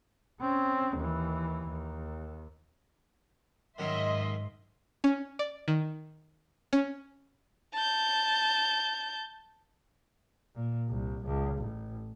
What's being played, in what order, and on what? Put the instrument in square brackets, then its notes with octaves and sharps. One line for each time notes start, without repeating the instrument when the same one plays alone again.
[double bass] C4 C#4
D#2 E3
D#2
[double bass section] G#2 [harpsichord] D#3 F#3 C#4 [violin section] D#5 E5 C6
[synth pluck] C#4
D5
D#3
C#4
[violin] A5 G6
[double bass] A#2
C2
C#2
A1